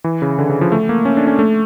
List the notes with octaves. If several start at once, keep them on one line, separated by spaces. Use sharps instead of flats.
E3
C#3
D3
C#3
F3
A3
A#3
C#4
D4
C#4
A3